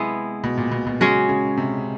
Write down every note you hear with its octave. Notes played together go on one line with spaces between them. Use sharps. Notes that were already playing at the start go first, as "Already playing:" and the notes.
Already playing: C3 G#3 B3 E4
B2
A#2
B2
B2
C#3 G#3 C#4 F#4
C#3
C3